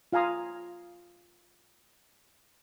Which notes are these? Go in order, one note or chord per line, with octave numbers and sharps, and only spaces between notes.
F4 F5 G#5 A#5 D#6